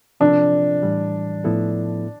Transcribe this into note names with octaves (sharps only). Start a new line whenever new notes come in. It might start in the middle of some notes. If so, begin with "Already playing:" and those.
C3 F3 C4 D4 F4 A4
A2 E3 G3
A2 F3 B3 E4 A4